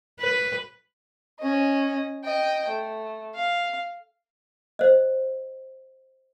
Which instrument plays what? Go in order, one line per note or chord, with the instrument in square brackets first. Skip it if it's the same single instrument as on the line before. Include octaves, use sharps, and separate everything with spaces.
[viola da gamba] B4
[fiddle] C#4 D#5
D#5 G5
A3
F5
[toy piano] C5 D#5